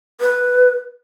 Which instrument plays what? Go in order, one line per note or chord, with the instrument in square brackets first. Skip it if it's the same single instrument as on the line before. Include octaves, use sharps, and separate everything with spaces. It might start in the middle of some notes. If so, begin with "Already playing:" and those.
[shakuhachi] B4